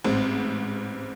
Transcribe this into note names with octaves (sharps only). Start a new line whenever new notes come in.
A1 G#2 C4